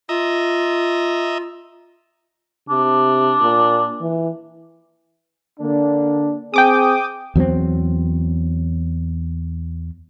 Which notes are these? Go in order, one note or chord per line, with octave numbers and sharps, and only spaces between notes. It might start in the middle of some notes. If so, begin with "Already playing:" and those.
F4 D#5 E5 A#5
C3 D4
A#2
E3
D3 A#3 D4
C4 G#4 G5 D6 D#6
E2 F#3 B3 C4